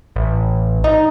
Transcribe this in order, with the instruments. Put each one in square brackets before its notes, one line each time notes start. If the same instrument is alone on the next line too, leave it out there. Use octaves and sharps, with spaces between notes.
[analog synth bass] A1
[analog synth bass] D#4 [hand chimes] D#5